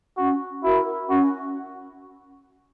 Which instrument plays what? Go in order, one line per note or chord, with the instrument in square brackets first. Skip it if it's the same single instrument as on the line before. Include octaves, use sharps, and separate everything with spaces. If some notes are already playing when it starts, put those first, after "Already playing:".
[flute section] C#4 [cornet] F#4
[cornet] E4 [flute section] F#4 A#4
[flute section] C#4 [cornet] F#4